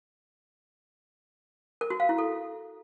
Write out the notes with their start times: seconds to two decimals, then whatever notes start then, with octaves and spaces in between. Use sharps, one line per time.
1.81 A#4
1.90 F#4
2.00 F5
2.09 E4
2.18 A4